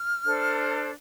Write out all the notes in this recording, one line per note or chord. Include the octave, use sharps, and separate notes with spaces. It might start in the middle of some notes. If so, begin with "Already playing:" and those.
Already playing: F6
D4 A4 C5